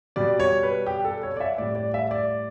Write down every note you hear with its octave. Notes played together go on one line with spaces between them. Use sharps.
B2 G3 D5
C#5
B4
G4
A4
C#5
D5
E5
A2 G3 D5
D5
E5
D5